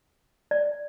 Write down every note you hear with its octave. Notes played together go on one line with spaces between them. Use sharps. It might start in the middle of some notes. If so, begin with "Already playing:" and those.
D5